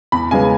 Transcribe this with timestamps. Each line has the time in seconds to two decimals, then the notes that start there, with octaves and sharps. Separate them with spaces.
0.12 E2 B5
0.31 C#3 G#3 B3 G#5